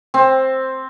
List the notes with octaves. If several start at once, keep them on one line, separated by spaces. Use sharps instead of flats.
C4